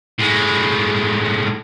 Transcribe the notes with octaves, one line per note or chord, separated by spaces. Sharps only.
A2 G#3